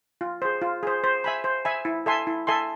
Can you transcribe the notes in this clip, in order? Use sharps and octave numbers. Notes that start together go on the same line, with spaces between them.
F4
G#4 C5
F4
G#4 C5
C5
E5 G#5 B5
C5
E5 G#5 B5
E4
A4 E5 G#5 C6
E4
A4 E5 G#5 C6